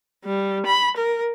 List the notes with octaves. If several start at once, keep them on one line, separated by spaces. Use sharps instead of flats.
G3
B5
A#4